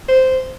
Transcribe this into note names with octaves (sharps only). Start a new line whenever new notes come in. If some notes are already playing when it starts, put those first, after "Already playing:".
C5